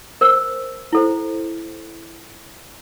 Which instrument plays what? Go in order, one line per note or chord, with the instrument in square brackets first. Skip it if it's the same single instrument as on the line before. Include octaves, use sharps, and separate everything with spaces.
[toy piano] A#4 C5 E6
E4 A4 C5